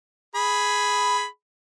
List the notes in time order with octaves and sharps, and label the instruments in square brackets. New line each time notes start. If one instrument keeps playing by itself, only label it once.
[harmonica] G#4 B5